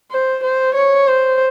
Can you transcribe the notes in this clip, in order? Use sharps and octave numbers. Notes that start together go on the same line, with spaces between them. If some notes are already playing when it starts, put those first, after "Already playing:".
C5
C5
C#5
C5